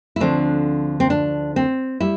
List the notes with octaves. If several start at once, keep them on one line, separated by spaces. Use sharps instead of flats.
E4
D2 D3 F3 C4 D4
C4
D4
C4
G3 E4